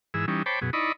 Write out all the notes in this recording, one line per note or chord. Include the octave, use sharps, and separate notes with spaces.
G#2 E3 G#4 E6
E3 G3 C#4 D#4
C5 C#5 G5 A5 B5 D6
F#2 B2 G#4
D#4 E4 D5 D#5 B5 C#6